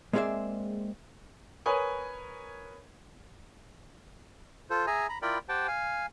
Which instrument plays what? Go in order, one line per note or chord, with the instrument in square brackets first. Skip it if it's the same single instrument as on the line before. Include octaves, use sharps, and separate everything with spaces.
[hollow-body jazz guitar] G#3 A#3 C4 G#4 D5 E5
[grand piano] A#4 B4 C#5 G#5 D#6
[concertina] F4 A4 C5
G#4 E5 G#5 A#5
A#5 B5
E4 F4 A#4 D5 G5 B5
G4 C5 F#5 G5 A5
F5 G#5